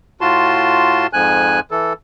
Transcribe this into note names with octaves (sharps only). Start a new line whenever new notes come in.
A2 F4 F#4 A5 C6
F2 G#2 G#5 F#6
E3 A4